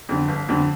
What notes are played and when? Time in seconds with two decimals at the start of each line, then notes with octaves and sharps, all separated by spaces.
0.09 F2 D3
0.28 G1
0.49 F2 D3